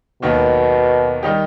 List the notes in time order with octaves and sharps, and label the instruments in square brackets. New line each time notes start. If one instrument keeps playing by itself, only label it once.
[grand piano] D#2 D#3 F#3 [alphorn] B2
[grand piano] D#3 G3 D#4 G4